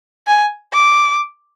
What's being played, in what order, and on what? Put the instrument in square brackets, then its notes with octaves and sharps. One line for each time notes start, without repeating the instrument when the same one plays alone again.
[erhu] G#5
D6